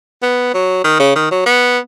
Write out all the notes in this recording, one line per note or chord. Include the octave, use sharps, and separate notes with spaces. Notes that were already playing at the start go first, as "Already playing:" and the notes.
B3
F#3
D#3
C#3
D#3
F#3
B3